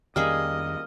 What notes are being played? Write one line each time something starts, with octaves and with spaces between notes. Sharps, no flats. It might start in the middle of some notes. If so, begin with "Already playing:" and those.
F2 D#3 G3 A#3 C#4 G#4 D#5 F6